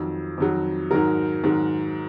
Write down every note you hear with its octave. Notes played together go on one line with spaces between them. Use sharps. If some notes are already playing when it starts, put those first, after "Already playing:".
Already playing: F2 D#3 F#3
F2 D#3 F#3
G#2 D#3 F#3 A#4
G#2 D#3 F#3